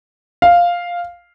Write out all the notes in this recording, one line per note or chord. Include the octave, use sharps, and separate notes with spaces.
F5